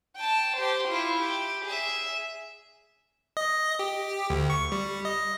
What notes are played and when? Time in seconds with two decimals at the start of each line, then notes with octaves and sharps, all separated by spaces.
0.16 G5 A5
0.56 G4 C5
0.88 E4 F4
1.20 G4
1.65 G#4 E5
3.37 D#5
3.79 G4
4.30 D2
4.50 C#6
4.72 G3
5.05 D#5